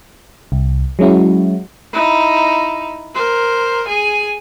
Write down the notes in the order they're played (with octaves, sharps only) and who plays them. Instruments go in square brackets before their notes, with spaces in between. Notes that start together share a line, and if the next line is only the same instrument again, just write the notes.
[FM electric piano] C2
F#3 G#3 C#4 E4 F#4
[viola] D#4 E4
A#4 C5
G#4 G#5